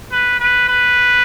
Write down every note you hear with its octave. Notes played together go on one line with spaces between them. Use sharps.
B4
B4
B4